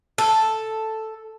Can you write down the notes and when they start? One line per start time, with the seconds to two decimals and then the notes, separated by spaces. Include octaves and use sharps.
0.18 A4